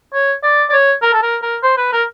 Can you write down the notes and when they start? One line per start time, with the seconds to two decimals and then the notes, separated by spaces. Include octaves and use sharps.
0.13 C#5
0.43 D5
0.70 D5
0.73 C#5
1.02 A#4
1.13 A4
1.23 A#4
1.42 A#4
1.63 C5
1.77 B4
1.93 A#4